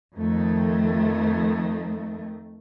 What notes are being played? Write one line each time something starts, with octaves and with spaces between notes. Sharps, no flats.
F2 D#3 A3